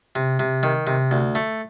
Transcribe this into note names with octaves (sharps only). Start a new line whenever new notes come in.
C3
C3
D#3
C3
D2
A3